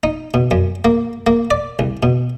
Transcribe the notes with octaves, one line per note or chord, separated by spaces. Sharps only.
D#4
B2
F#2
A#3
A#3
D5
C2
B2